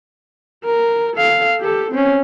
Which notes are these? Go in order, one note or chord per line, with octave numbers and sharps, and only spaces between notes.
A#4
A4 F5
G4 A4
C4 C#4